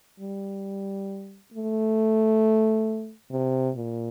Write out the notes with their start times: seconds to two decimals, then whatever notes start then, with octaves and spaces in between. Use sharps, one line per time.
0.20 G3
1.54 A3
3.31 C3
3.76 A#2